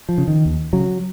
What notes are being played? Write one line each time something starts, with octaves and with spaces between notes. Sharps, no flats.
F3
C#3
D#3
D#2
C#3 F#3